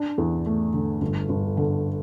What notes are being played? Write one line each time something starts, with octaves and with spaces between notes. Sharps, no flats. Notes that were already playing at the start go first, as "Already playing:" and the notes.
Already playing: D4
E2
A3
D3
G1
G1
D3